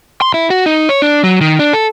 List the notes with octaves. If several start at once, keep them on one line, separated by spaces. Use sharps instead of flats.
C6
E4
F#4
D#4
C#5
D4
F#3
D#3
D4
A4